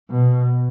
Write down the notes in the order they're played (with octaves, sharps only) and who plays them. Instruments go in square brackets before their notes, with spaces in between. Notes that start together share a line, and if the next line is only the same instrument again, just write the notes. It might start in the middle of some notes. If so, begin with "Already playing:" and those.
[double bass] B2